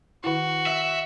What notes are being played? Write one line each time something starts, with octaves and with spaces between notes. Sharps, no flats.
D#3 E4 F#4
E5